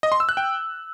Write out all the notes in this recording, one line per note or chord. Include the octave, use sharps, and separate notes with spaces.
D#5
C6
E6
F#6
G5